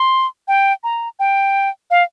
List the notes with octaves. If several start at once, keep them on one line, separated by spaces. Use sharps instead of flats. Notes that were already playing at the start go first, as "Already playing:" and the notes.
Already playing: C6
G5
A#5
G5
F5